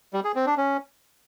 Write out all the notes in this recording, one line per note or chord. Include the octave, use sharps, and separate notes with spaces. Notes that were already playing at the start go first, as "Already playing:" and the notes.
G3
G#4
C4
D4
C#4